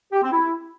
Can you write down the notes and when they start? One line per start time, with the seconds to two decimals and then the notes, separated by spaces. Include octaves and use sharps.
0.13 G4
0.22 C4
0.32 E4